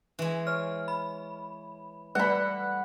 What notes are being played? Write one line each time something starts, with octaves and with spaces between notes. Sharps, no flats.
E3 G#3
C#5 F6
B5
G3 A3 B4 D5 F#5 B5